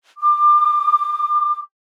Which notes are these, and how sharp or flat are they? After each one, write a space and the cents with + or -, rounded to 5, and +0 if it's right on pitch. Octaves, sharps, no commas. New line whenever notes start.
D6 +30